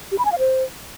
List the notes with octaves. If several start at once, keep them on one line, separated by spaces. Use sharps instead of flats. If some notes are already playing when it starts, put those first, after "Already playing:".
G4
B5
G#5
F5
C5